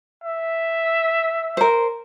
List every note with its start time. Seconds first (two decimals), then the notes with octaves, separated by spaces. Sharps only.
0.24 E5
1.57 A#4 C5